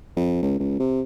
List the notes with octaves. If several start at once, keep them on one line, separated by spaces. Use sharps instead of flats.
F2
C#2
C#2
C3